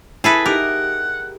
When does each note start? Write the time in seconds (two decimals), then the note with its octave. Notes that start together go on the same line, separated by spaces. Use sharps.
0.24 E4 G#4 A4 B4
0.46 D#4 G4 A#4 F#5